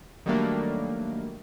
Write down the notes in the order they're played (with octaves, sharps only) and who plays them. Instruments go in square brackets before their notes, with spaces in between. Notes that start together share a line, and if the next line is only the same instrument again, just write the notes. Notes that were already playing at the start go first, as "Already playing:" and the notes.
[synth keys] D#3 F#3 G3 A3 A#3 D4